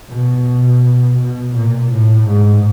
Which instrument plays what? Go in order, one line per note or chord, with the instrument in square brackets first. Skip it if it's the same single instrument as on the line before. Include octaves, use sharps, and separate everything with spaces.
[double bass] B2
B2
A#2
A2
G#2